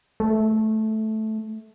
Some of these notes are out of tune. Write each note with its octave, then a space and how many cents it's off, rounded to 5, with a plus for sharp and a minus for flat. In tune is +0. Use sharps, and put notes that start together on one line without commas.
A3 -10